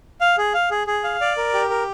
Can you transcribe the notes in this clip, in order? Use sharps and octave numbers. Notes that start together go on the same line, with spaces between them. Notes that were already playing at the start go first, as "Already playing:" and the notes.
F5
G#4
F5
G#4
G#4
F5
D5
A#4
G4
A#4